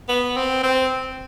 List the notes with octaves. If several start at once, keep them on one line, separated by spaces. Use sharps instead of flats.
B3
C4
C4